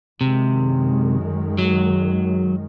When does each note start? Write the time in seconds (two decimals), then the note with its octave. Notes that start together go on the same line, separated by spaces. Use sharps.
0.20 F#2 C3 D#3 G#3
1.58 F#3